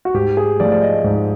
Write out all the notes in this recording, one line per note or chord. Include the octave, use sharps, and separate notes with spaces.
F#4
G#2 G4
G#4
F3 A3 D5
D5
D#5
G#2